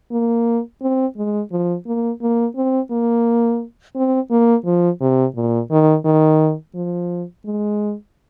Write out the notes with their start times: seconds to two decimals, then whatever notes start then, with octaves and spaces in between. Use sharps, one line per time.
0.11 A#3
0.81 C4
1.17 G#3
1.51 F3
1.86 A#3
2.21 A#3
2.56 C4
2.91 A#3
3.95 C4
4.30 A#3
4.65 F3
5.01 C3
5.35 A#2
5.71 D#3
6.05 D#3
6.75 F3
7.45 G#3